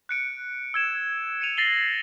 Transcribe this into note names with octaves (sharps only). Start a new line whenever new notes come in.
F#6 C#7 D7
E6 G#6 E7
C#7 D#7 F7
A6 A#6 C7 D#7 F#7 G7